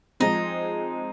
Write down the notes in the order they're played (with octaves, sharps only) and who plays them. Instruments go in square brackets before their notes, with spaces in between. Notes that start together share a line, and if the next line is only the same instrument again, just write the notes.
[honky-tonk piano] F3 G#3 C4 [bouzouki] D#4